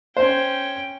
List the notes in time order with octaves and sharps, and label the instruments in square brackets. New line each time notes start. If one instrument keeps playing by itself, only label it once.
[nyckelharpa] C#4 G5 [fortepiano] C5